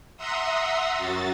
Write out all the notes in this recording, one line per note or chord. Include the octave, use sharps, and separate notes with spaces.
E5 F#5 A#5 C6 D#6 E6
F#2 F#4 A6